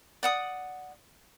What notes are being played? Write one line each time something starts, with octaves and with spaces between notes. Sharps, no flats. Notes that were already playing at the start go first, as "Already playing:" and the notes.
D5 F#5 D#6